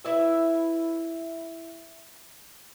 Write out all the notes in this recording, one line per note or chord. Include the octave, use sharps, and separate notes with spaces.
E4 B4 E5